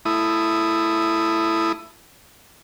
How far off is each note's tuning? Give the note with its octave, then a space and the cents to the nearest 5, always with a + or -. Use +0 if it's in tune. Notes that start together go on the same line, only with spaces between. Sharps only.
A3 +0 E4 +10 D#6 +0